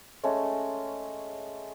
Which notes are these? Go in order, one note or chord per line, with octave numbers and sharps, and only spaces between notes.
G#3 A3 C#4